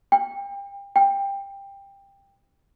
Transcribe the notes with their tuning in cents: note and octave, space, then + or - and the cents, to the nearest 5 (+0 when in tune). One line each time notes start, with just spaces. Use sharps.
G5 +30
G5 +15